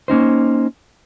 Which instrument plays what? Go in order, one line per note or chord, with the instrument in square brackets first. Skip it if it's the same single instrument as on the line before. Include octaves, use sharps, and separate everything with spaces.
[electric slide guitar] A#3 C#4 D#4 C5